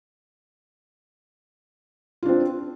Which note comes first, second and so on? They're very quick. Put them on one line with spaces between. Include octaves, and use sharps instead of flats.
F4 D4 C4